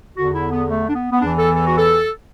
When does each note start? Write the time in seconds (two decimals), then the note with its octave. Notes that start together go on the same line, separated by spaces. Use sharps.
0.17 E2 D3 F#4
0.35 E4
0.52 B3
0.70 A3
0.89 D4
0.95 B3
1.12 B3
1.21 E2 E3 D4
1.38 A4
1.56 A4
1.66 F#4
1.77 A4